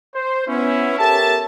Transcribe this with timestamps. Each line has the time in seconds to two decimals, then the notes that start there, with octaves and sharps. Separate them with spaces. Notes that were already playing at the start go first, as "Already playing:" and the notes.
0.15 C5
0.48 B3 C#4 E4
0.99 G4 A4 A#4 C#5 E5 A5